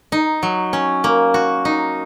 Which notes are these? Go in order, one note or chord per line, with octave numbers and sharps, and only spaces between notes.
D#4
F#3
C#4
A#3
F#4
D#4